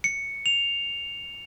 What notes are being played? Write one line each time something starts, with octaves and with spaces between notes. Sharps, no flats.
C#7
F7